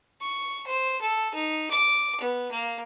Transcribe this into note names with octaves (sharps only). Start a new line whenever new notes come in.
C#6
C5
A4
D#4
D6
B3
A#3